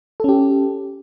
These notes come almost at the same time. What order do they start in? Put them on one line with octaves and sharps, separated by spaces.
A4 C#4 G4